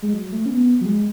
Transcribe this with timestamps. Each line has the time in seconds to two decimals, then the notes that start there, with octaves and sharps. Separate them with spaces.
0.02 G#3
0.13 F#3
0.32 A3
0.46 C#4
0.50 B3
0.81 F#3
0.85 G#3